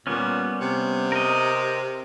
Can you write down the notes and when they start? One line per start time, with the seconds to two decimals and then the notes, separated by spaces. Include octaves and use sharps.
0.07 A#2 G3 B3 C#4
0.61 C3
1.12 A#4 D#5